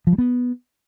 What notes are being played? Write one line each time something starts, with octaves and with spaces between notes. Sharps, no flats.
F3
G3
B3